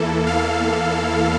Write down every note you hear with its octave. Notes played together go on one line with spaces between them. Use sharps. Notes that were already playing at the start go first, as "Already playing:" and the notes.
Already playing: E2 E3 A#3 E4 A4
F5